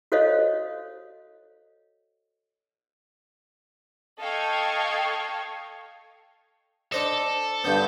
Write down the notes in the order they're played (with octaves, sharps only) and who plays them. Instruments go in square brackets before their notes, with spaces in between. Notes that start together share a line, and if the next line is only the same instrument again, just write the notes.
[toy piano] F#4 A4 C5 C#5 D#5 F5
[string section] A4 D#5 F5 G5 C#6 G#6
[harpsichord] D4 C5 D#5 [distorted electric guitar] A4
[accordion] G2 G6 [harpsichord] D3 B3